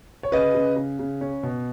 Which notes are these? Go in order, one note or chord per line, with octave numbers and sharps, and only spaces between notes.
C#5
C#3 B4 D#5
C#3
C#3
C#3
C#4
B2